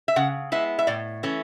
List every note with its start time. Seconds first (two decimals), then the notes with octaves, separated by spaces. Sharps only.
0.08 E5
0.16 C#3 F#5
0.52 G#3 B3 E4 E5
0.79 E5
0.87 A2 D5
1.23 E3 A3 C#4